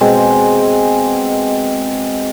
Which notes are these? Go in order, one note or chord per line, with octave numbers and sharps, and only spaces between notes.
B2 G#3 C4